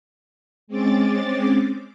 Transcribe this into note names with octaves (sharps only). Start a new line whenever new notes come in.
G#3 C4 C#4 D6 A6